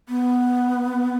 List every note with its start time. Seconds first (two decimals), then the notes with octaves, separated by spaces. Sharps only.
0.09 B3